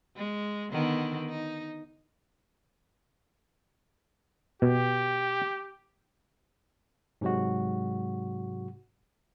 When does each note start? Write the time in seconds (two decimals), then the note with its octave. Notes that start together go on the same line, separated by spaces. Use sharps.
0.16 G#3
0.70 D3 D#3 B3
1.28 D#4
4.62 B2 G4
7.21 G#2 C3 F#3 G#3 F#4